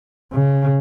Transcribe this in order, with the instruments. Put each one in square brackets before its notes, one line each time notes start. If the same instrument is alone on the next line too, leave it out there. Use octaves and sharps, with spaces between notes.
[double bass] C#3